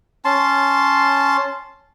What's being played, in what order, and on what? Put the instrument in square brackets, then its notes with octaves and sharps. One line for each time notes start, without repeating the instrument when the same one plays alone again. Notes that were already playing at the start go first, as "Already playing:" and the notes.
[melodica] C#4 A5 C6